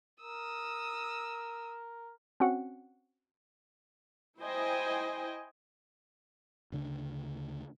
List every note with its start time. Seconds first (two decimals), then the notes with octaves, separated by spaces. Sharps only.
0.21 A#4 D#6 E6
2.40 C4 C#4 F#4 F#5
4.39 E4 C5 D#5 G5 G#5
6.72 D2 C#3 D4